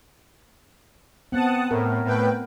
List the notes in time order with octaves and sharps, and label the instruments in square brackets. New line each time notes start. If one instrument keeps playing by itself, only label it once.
[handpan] B3 C4 [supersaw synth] F#5 A5 D#6
[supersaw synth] A2 [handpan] A#4
[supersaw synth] A2 B4 G5